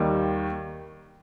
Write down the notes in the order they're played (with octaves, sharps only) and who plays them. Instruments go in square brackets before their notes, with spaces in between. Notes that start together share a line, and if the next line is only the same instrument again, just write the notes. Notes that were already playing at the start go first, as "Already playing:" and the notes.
Already playing: [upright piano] D#2 D#3 G3